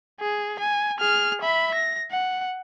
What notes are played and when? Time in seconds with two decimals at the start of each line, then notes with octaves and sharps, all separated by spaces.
0.21 G#4
0.59 G#5
0.98 G#4 F6
1.41 E5 B5
1.74 A#6
2.11 F#5